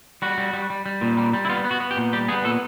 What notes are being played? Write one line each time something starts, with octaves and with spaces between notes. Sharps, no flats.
G3 F#4
G3
G3
G3
G3
A#2
G3
G3
E4
B3 F4
B3
F#4
B3
G4
A#2
G3 G4
B3 G#4
A#2 A4